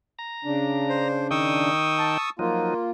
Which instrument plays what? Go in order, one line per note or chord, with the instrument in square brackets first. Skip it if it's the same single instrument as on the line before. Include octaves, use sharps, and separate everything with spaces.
[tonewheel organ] A#5
[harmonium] C#3 D4
[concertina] C5
[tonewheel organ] D#3 D#4 G5 [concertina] C#6 D#6 E6
[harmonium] A5
[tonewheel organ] F3 F#3 D#4 [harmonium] A#3 F4